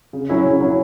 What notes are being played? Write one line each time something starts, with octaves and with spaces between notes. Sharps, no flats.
C#3
F#3 C#4 E4
C#3
F#3 C#4 E4